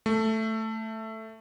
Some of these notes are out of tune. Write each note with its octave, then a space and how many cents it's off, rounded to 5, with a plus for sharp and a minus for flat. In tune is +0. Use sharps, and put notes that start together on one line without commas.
A3 +5